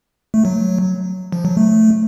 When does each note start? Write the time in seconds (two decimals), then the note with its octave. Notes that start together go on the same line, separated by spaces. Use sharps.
0.34 A3
0.45 F#3
1.32 F3
1.45 F#3
1.57 A3